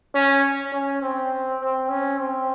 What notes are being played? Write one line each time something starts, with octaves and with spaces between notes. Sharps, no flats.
C#4
C#4
C4
C4
C#4
C4